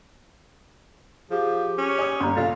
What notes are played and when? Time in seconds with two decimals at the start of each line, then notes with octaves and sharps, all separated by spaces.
1.31 F3 G4 G#4
1.78 C#4
1.98 C#5 G#5 D#6
2.20 G1 A#5 C6
2.36 A#1 C#3 F4 A4 A6